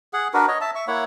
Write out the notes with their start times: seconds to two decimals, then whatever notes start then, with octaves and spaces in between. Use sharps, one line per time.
0.13 G#4 F#5
0.34 D4 F#4 A#4 B4
0.48 C#5 D#5
0.61 E5 A5
0.75 E5 C#6
0.88 A#3 E4 C#5 F#5